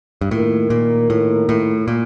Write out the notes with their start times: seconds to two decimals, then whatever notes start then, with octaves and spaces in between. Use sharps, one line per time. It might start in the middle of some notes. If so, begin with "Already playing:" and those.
0.21 G2
0.31 A2 D#3 A#3 F4 A#4
0.70 A#2
1.10 A2
1.49 A2
1.88 A#2